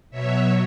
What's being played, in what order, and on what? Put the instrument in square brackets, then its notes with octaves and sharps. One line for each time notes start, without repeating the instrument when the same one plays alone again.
[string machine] B2 F#3 C#5 E5